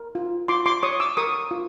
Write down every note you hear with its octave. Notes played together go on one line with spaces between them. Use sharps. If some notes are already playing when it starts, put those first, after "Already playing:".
Already playing: A#4
F4
F4 C6 D6
C6 D6
C#5 C#6 D#6
D6 E6
A#4 C#6 D#6
F4